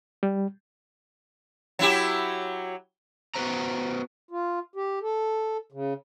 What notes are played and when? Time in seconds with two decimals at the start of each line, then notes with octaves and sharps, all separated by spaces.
0.23 G3
1.79 F#3 E4 G4
3.34 B3 F#4 B4 C5 A#5
4.31 F4
4.76 G4
5.02 A4
5.72 C#3